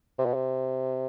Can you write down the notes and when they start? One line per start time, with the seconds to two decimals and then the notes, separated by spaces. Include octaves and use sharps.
0.18 C3
0.26 B2
0.34 C3